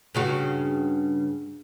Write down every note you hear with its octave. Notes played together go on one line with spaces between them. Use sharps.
G2 C#3 F#4